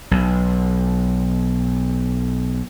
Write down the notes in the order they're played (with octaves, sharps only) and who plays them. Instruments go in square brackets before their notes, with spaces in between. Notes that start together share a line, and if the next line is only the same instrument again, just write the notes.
[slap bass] B1 B2